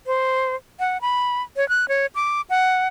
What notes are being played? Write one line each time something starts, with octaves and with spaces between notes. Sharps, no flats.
C5
F#5
B5
C#5
F#6
C#5
D6
F#5